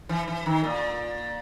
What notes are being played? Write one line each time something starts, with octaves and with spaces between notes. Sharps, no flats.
E3
E3
D#3
A#2